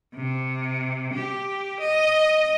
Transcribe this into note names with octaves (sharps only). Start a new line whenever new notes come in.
C3
G4
D#5